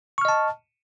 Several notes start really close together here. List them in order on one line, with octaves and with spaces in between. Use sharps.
C#6 F6 D#5 A5